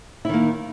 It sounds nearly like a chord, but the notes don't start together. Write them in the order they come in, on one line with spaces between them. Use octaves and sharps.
E4 D#3 A#3